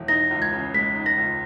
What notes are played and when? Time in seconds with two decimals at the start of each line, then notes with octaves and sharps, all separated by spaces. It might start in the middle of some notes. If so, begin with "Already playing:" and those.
Already playing: E1
0.08 D#4 A#6
0.31 C#2
0.42 G#6
0.53 C#3
0.74 G#3 B6
0.96 D#4
1.06 A#6
1.18 C#2